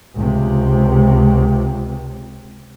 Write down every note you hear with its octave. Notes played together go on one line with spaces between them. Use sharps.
C#2 C3